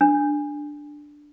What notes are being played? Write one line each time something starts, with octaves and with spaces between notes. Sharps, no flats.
D4